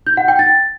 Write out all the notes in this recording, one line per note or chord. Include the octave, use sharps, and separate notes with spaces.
G6
F#5
G5
A6